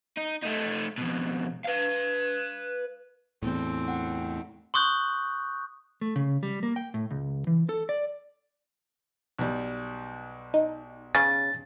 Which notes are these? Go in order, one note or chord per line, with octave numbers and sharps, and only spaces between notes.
D#4
A3 D#4
F2 B2
B4 F5
E2 A2 C4
F#5 G5
C6 C#6 D#6 F#6 G6
A3
C#3
G3
A#3
G5
A2
C#2
E3
A4
D5
B1 G3
D#4
C#3 A6